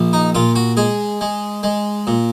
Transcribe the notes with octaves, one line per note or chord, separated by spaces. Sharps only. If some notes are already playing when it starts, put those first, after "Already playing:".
Already playing: A#1
D#4
A#2 F4
F#4
G#3 G#4
G#3
G#3
A#2